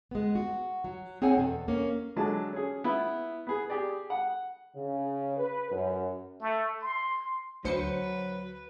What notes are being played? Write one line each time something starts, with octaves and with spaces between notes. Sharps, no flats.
G#3 B3
F#4
F#3
C4 G#4 C#5 F#5 G#5
E2 B2 A4
A#3 C#4
D3 F#3 G#3 A5
C#4 G#4
B3 E4
B3 G#4
G4 G#4 D5
F#5
C#3
B4
F#2
A3
C6
D2 F#3 B4 C5 C#7